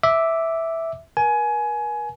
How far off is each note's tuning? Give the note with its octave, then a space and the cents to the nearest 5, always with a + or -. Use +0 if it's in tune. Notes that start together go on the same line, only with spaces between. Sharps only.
E5 -5 D6 +0
A#4 +45 G#5 +20